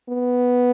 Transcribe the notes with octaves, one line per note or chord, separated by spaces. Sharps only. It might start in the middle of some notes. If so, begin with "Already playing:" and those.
B3